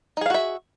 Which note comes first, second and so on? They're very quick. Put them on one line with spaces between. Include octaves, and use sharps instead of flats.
D#4 G#4 F5 F#4 E5